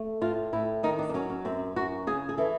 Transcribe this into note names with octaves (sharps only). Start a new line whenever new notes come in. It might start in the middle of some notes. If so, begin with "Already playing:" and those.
Already playing: A3
A2 F4
A2 E4
D#3 D#4
D4
D4
F#3 C#4
C#4
F#2 C4
F#2 F#4
C#3 G#4
G#4
E3 A4